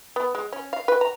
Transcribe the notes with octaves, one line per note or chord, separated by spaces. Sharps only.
B3
G#3
C#4
F5
B4
A#5